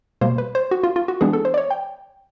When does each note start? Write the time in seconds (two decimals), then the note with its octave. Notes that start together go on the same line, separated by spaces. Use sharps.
0.21 B2 G3 A#3 C5
0.38 B4
0.55 C5
0.71 F#4
0.83 F4
0.96 F4
1.08 F#4
1.21 E3 G#3 B3 D4 G#4
1.33 A4
1.45 C5
1.54 D5
1.58 C#5
1.71 G5